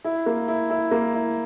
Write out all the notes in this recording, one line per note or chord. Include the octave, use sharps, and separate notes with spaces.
E4
A#3
E4
E4
A#3
E4